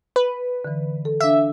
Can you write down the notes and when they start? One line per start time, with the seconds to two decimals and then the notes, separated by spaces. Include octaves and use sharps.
0.16 B4
0.65 D3 E3
1.05 A4
1.21 D4 E5 F5